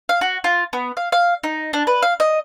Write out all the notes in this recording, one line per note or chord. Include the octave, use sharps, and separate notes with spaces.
F5
F#4
F4
B3
F5
F5
D#4
D4
B4
F5
D#5